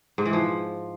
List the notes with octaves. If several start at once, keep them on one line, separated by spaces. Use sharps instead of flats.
G#2
E3
F3